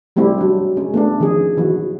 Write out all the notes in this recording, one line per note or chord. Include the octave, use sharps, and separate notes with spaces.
F#3 G3 A3 C4 E4 G4
F#3 D4
G#3 C#4
A3 B3 D4
D#3 F3 C#4 G#4
D#3 E3 F#3 F#4